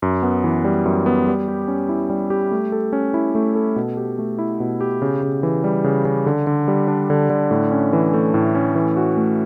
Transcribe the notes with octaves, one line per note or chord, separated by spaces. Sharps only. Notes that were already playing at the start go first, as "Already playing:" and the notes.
F#2
B3
E3
G3
F#2
B3
G3
G4
C#4
E4
G3
G4
A3
A4
C#4
E4
A3
A4
B2
G4
A3
E4
B2
G4
C#3
C#3
E3
G3
C#3
C#3
D3
D3
G3
D4
D3
D3
A2
C#4
E3
A3
A2
C#4
E3
F#4
A3